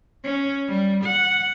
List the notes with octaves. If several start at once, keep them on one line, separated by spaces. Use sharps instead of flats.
C#4
G3
F#5